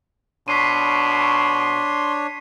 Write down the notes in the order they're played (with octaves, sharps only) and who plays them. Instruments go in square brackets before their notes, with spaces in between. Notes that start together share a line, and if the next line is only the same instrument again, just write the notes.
[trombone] B2 [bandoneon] D4 C#5 [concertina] C6 [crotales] B6 C7 D#7